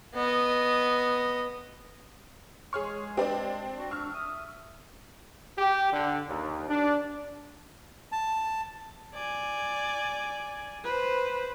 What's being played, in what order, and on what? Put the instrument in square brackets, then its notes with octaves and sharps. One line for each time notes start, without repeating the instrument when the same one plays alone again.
[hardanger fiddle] B3 D#5
[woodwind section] G#3 [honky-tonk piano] G#4 C#5 C6 [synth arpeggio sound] C#6 F6
[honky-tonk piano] C4 D4 [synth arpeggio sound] G4 B4 D5
[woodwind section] F#4
[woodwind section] D4 [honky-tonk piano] C#6 E6 F6
[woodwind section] E5 D#6
[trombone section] G4
D3
D#2
D4
[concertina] A5
[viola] D5 G#5
B4 C5